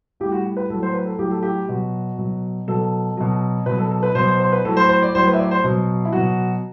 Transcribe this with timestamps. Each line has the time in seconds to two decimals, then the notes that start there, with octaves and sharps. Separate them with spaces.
0.20 A2 G3 G4
0.32 F#4
0.57 B4
0.70 A2 F#3 A4
0.82 C5
0.94 B4
1.06 A4
1.18 A2 F#3 G4
1.31 A4
1.43 G4
1.68 B2 F#3 F#4
2.18 B2 F#3
2.67 B2 F#3 A4
3.17 B2 F#3
3.66 B2 B4
3.71 F#3
3.78 A4
3.91 A4
4.03 B4
4.15 B2 F#3 C5
4.28 C5
4.40 C5
4.52 B4
4.64 A2 F#3 A4
4.77 C5
4.89 C5
5.02 D5
5.15 A2 F#3 C5
5.27 B4
5.33 E5
5.39 D5
5.51 C5
5.64 B2 F#3
6.05 E4
6.12 B2 F#3 F#4